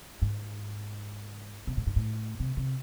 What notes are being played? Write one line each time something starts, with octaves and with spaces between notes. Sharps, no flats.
G#2
C3
A2
G#2
A2
C3
C3